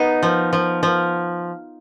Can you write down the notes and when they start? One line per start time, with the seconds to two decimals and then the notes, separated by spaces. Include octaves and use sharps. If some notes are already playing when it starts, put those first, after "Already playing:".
Already playing: B3 D#4
0.23 F3
0.53 F3
0.83 F3